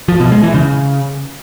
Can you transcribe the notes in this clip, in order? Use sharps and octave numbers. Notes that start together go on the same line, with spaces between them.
F3
B2
G#3
E3
C#3